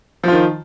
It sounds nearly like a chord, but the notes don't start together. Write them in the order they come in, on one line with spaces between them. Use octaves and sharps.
F3 F4 D#3